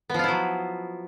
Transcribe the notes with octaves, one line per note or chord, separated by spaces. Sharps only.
F3 F#3 B3 E4 F4